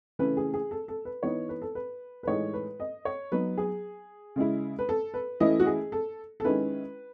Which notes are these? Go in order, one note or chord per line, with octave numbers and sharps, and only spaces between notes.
C#3 E3 A3 C#4 B4
G#4
G#4
A4
A4
B4
E3 B3 D#4 C#5
B4
A4
B4
B4
A2 E3 G#3 D#4 C#5
B4
D#5
C#5
F#3 B3 D#4 B4
G#4
C#3 G#3 C#4 E4
B4
A4
B4
E3 A3 C#4 E4 D#5
F#4
G#4
A4
A4
D#3 G#3 C#4 E4 B4